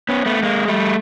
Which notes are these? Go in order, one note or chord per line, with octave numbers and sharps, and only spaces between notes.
B3 C#4
A3 B3
G#3 A#3
G3 A3